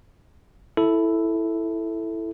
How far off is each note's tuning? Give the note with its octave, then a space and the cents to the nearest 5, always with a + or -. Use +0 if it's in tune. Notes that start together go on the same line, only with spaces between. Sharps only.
E4 +0 A4 +0